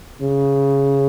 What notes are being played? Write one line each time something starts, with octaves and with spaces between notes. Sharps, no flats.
C#3